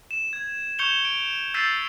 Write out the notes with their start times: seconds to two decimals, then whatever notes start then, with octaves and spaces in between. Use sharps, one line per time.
0.11 E7
0.33 G#6
0.79 C#6 G6 C#7 E7 F7 G7
1.05 D7
1.54 E6 G6 A6 B6 C7 D#7